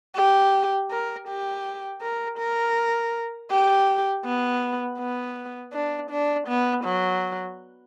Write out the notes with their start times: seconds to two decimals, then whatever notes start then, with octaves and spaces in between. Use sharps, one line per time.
0.15 G4
0.91 A#4
1.28 G4
2.01 A#4
2.38 A#4
3.51 G4
4.25 B3
4.99 B3
5.73 D4
6.10 D4
6.48 B3
6.84 F#3